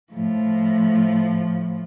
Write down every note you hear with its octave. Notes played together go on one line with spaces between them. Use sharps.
A2 F3